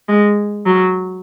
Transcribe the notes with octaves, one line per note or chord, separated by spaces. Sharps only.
G#3
F#3